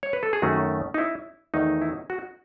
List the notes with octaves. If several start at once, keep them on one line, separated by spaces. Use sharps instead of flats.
C#5
B4
A4
G#4
F#2 D#3 A3 C#4 F#4
D#4
E4
E2 D#3 A3 D#4
E4
F#4